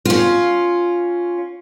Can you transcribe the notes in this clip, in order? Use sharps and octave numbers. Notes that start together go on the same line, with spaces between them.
C#4 F4